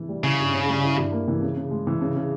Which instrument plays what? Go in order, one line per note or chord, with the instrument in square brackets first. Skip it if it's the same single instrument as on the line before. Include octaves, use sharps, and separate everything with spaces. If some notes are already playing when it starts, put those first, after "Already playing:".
Already playing: [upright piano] E3
G3
[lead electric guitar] C#3 [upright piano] E4
[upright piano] G2
C#4
G3
E4
G2
A#3
E3
C#3
C#3
G#3
E3
C#3
C#3